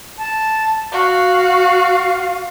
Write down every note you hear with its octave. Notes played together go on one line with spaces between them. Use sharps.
A5
F#4 F5